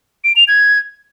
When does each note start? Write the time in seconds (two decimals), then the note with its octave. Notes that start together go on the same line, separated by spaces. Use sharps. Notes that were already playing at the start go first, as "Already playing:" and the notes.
0.24 D7
0.36 F7
0.48 G#6